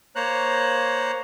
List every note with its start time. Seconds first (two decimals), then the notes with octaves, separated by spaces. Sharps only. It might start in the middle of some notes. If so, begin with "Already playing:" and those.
0.16 A#3 C5 C#5 A#5 F#6